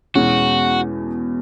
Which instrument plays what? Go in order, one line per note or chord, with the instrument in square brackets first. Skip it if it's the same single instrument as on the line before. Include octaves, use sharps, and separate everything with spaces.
[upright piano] E2 B2 G#3 C#4 [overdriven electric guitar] F#4